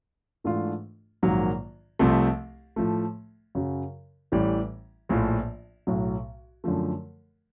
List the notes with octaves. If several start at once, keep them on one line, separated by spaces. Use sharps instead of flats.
G#2 E3 A3 D4 F4
A#1 G#2 D#3 F#3 A#3
C2 C3 F3 A3 C4
A2 F3 A3
F#2 C#3 F#3
A1 A2 E3 G3
A#1 A2 F3
B1 A2 F#3
F#2 D3 F3 A3